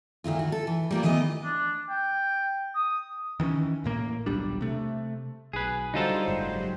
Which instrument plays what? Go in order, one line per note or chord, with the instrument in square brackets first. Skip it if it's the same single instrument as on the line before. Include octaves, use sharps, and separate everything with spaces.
[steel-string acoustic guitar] D2 D#3 E4 F4
F#4
A4
E3
G3 A#3 F4
D#3 E3 A3 B3 D#5
[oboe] D4
G5
D#6
[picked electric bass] D#3 E3 G3 C#4
A1 A2 A#3
D#1 B1 G3 D4
C3 A3
[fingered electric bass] B1 [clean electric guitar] G#4 B4
[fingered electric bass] D3 [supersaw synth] F#3 G3 C5 [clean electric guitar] D#4 F4 A4
[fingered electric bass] F#1 G#2